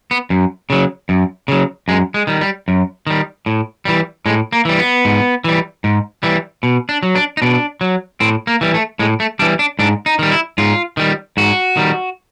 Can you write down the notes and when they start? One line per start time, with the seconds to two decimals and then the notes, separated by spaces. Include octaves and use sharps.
0.11 B3
0.30 F#2
0.70 C#3 F#3
1.09 F#2
1.48 C#3 F#3
1.88 F#2 G#3
2.14 G#3
2.27 D#3 G3
2.41 G3
2.68 F#2
3.07 D#3 G3
3.46 A2
3.85 E3 G3
4.26 A2 G#3
4.52 A#3
4.65 E3 G3
4.79 B3
5.05 G#2
5.44 E3 G3
5.84 G#2
6.23 E3 G3
6.63 B2
6.89 D4
7.03 F#3
7.15 D4
7.37 D#4
7.42 B2 D4
7.81 F#3
8.20 A2 C4
8.47 A#3
8.61 E3 G3
8.74 A3
8.99 A2 G#3
9.20 A3
9.39 E3 G3 D4
9.59 D4
9.79 G#2 D4
10.06 D#4
10.19 D#3 G3
10.31 E4
10.58 G#2 F4
10.97 D#3 G3
11.37 G#2 F#4
11.77 D#3 G3